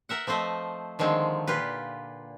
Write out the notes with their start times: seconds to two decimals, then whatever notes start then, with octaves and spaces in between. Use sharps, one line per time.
0.09 A#4 E5 F#5
0.27 F3 A3 C4 C5 D#5
0.99 D3 D#3 F3 G#3 C4
1.47 A#2 F4 G4 B4